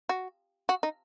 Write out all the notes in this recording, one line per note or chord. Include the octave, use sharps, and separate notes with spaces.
F#4
F#4
D#4